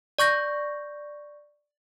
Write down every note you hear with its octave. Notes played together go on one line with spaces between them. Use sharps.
D5 C#6 G6 A#6